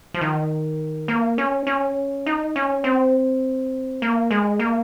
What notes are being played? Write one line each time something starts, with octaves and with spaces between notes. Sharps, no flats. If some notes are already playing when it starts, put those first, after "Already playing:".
F3
D#3
A#3
C#4
C#4
D#4
C#4
C4
A#3
G#3
A#3